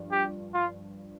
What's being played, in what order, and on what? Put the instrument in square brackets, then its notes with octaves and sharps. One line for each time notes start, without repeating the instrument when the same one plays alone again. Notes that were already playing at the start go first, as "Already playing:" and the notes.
Already playing: [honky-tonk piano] G2 F3 D4
[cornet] G4
F4